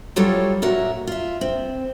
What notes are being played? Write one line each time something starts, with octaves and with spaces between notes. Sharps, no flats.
F#3 G3 F4 F#4 A4 C#5
A#2 F#4 A#4 E5
F4 E5
C4